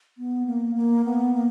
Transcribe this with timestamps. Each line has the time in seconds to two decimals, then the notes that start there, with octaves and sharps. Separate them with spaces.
0.18 B3
0.46 A#3
0.75 A#3
1.05 B3
1.34 A#3